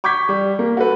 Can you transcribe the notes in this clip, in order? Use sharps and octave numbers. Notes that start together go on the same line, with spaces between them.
C#6 D6 G6 G#6 B6
G3
A#3
F#4 A4 B4